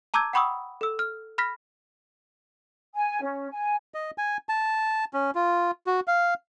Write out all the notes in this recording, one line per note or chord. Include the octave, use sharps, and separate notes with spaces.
A5 A#5 D6 E6 G6 G#6
F#5 G5 B5 C#6 D#6 E6
A4 E6
F6
B5 F6 A#6 B6
G#5
C#4
G#5
D#5
G#5
A5
C#4
F4
F#4
F5